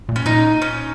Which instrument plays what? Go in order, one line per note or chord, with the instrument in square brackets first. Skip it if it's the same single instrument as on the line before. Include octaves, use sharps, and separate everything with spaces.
[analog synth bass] A#2
[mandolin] C#4
[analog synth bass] A#2 [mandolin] D#4
[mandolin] C#4